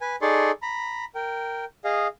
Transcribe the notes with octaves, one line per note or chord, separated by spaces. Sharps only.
B4 G#5
D#4 G#4 A4 D5 C6 C#6
A#5 B5
A#4 G5
G#4 D#5 F5